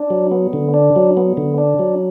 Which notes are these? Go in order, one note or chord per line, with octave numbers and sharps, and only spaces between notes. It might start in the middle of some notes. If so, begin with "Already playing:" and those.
Already playing: D4
F#3
B3
D3
D4
F#3
B3
D3
D4
F#3